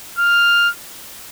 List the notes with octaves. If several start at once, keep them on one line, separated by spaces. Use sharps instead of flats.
F6